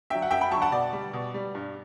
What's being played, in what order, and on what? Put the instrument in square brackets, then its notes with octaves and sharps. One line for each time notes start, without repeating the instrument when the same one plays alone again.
[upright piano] D3 F#3 E5 G5
F#5
F#2 E5 G5
G5 B5
D3 F#3 A5 C#6
F#5 A5
B2 D5
G3
B2
G3
G2